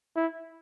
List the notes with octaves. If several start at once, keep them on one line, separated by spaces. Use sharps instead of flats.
E4